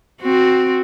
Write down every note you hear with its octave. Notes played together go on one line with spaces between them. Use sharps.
C4 F#4